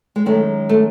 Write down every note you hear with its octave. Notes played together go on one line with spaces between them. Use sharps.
G#3
F#2 D#3 G#3 A3
A3